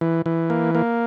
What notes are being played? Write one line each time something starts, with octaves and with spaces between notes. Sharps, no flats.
E3
E3
A#3
A#3